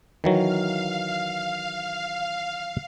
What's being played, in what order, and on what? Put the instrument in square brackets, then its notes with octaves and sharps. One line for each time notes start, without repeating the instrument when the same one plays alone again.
[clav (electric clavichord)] D#3 E3 F#3 [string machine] F5